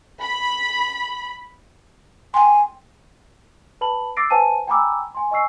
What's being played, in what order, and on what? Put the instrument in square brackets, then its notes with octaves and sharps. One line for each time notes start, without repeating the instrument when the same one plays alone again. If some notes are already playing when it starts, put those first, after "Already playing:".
[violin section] B5
[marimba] G5 C6 [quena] G#5
[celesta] B4 A5 B5 F#7
D6 E6 A6 A#6 C7 D7
B4 C5 F#5 G#5 A5 D#7
G5 G#5 A#5 B5 D6 E6
G#5 C6
D#5 G#5 C#6 E6 C7